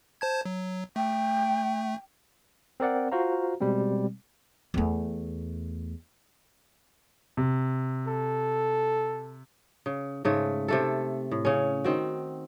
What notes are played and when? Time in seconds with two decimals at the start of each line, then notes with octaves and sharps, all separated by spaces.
0.21 C5 A5 G#6
0.45 F#3
0.96 A3 G5
2.80 C4 A#4 D5 F#5
3.12 F4 F#4 C5 F5 A#5
3.61 B2 G3 G#3 C4
4.74 E2 A3
7.37 C3
8.08 A4
9.86 C#3
10.25 G#2 C#3 A3
10.68 C3 A3 A4
11.31 A2
11.45 C#3 C#4
11.84 D#3 C4 F#4